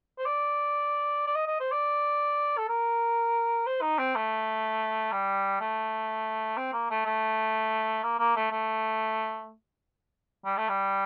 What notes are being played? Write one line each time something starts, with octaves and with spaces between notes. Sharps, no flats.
C5
D5
D5
D#5
D#5
C5
D5
A4
A#4
C5
D#4
C4
A3
G3
A3
C4
A#3
A3
A3
A#3
A#3
A3
A3
G3
A3
G3